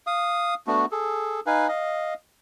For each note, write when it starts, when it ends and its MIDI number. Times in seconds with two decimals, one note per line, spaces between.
0.07 0.54 77
0.07 0.54 87
0.67 0.85 57
0.67 0.85 59
0.67 0.85 62
0.67 0.85 66
0.91 1.40 68
0.91 1.40 69
1.46 1.68 63
1.46 1.68 71
1.46 1.68 77
1.46 1.68 80
1.69 2.14 75
1.69 2.14 77